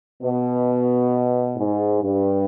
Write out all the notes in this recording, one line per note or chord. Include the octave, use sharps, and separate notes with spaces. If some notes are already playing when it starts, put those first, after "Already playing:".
B2
G#2
G2